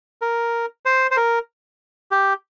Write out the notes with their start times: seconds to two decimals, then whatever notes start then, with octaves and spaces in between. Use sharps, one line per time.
0.22 A#4
0.85 C5
1.11 C5
1.17 A#4
2.11 G4